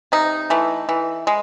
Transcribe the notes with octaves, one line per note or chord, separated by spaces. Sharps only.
C3 D#4
E3 A3
E3
G#3